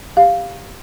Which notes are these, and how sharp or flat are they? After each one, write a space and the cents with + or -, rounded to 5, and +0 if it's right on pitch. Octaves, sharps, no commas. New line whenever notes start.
G4 +10 F5 +0